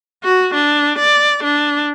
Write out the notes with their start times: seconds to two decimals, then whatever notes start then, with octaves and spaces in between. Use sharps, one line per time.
0.24 F#4
0.54 D4
0.99 D5
1.43 D4